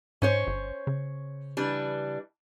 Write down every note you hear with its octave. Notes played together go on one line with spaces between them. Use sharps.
G#2 C#4 C5 C#5
G1
C#3
E3 G3 D4